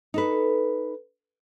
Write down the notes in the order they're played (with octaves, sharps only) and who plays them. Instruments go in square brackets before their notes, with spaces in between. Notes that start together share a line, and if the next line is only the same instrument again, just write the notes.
[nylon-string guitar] D#4 A4 B4